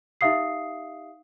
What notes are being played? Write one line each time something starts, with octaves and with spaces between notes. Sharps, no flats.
D#4 G4 E5 F5 D#6 C7